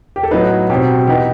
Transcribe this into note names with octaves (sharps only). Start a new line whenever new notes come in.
G4
A4
A2 F#3 B3 D#4 B4
B2 F#3 C4 G4
E3 B3 D#4 G4